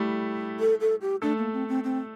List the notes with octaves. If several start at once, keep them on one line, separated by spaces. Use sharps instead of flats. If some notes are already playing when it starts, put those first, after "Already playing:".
Already playing: G3 A3 E4 G4 A4
A4
A4
G4
A3 D4 A4
A#3
C4
C4
C4